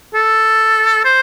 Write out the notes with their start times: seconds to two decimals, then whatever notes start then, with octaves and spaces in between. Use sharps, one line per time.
0.15 A4
1.05 C5